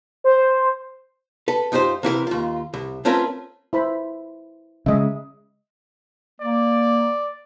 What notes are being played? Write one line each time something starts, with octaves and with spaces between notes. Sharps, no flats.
C5
A4 B4
F#2 D#4 F4 G4 C5
C3 E3 F#4 A#4
D#2 F4
C2
A3 C4 C#4 F4 A#4 B4
E4 C5 B5
C#3 G#3 D#5 E5
A#3 D5